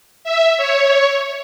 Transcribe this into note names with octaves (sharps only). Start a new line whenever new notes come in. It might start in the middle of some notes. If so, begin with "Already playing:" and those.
E5
C#5